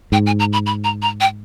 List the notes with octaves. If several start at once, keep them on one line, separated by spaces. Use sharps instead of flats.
G#2 G5
G#5
A#5
B5
B5
A#5
A#5
G5